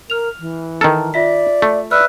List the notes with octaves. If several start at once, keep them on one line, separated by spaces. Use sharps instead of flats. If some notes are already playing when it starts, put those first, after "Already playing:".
A#4 F6 F7
E3
D#3 A4 A5 A#5 F6
F4 D5 E5 B6
A3
B4 D5 E5 F6